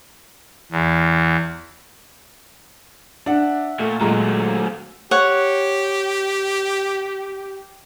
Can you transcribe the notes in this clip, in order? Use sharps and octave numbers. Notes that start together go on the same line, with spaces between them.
E2
D4 E5 F#5
A#2 A3
A#2 F#3 G#3 A3 A#5
G4 C#5 F#5